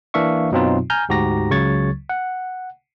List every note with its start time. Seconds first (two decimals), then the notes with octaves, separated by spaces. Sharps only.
0.14 E3 A#3 D4 E5 F5 C#6
0.51 F#2 B2 F#3 C4 D#4 F4
0.90 G#5 A#5 F6 G6
1.09 D2 G#2 F#4 G4 A#5 A#6
1.50 C#2 C#3 F#3 C#6 G#6 A6
2.09 F#5